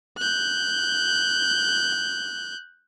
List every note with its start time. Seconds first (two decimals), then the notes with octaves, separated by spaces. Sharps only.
0.18 F#6 G6